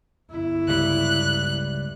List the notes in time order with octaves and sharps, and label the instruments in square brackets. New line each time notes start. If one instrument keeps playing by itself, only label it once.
[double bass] G1 E4
[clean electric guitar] C#2 G3 [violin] F#6